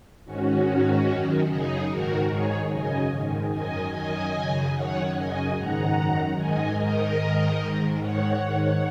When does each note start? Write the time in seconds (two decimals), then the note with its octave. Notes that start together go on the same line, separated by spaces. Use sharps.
0.25 G#2 D#3 C#4 F#4
0.67 G#2 D#3
1.07 F#2 D#3
1.48 F#2 C#3 D#4 G#4
1.88 G#2 D#3 F#4 A#4
2.28 G#2 D#3 G#4 C#5
2.70 F#2 C#3 D#5 G#5
3.10 G#2 D#3
3.51 F#2 D#3 D#5 G#5
3.92 F#2 D#3 D#5 G#5
4.33 F#2 C#3
4.74 F#2 D#3 C#5 F#5
5.14 F#2 C#3 D#5 G#5
5.55 G#2 D#3 F#5 A#5
5.96 F#2 D#3
6.36 G#2 D#3 D#5 G#5
6.77 G#2 D#3 A#4 D#5
7.19 G#2 D#3
7.60 G#2 D#3
8.00 G#2 D#3 C#5 F#5
8.41 G#2 D#3